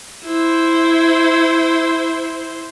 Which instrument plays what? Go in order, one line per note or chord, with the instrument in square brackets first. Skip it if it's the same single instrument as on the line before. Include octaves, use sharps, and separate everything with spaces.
[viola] E4 C5